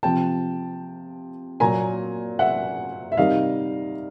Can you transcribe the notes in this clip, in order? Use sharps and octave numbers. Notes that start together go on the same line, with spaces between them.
C3 F3 G5 A5
A#2 F#3 G#5 A#5
E5 F#5
E5
C3 D#3 G3 D#5 F5